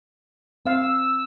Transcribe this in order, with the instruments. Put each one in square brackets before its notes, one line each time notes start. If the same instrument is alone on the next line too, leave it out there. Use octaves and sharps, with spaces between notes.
[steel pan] C4 F5 [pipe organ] E6